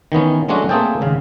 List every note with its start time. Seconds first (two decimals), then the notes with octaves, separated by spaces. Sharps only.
0.12 D#3 E3 B3 C#4
0.49 F#3 G#3 A3 C#4 D4 F#4
0.69 A3 A#3 C4 G#4 A4 G5
1.01 G#1 C#3 F5